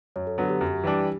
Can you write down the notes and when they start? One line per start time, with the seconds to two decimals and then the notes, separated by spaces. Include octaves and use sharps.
0.16 F#2 C#5
0.27 A4
0.38 D3 F#3 B3
0.49 G4
0.61 F#2
0.84 E3 G3 D4